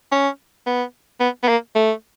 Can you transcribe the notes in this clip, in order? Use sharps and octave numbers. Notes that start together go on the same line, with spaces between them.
C#4
B3
B3
B3
A#3
A3